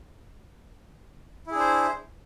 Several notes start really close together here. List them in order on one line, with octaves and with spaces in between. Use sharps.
E4 G#4 D4 C5